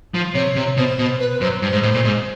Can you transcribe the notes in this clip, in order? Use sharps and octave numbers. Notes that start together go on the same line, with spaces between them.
F3
C3 C#5
C3
B2 C5
B2
B4
B4
F#2 C5
G2 C5
G#2
A2
A#2
G#2